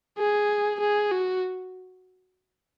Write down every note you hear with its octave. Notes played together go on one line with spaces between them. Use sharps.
G#4
G#4
F#4